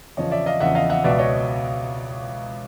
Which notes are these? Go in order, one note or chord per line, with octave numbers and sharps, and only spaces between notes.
E2 C#3 F3 C#5 D#5
D5 E5
D#5 F5
E2 C#3 F3 E5 F#5
D#5 F5
E5 F#5
C#2 B2 D5 E5
C#5 D#5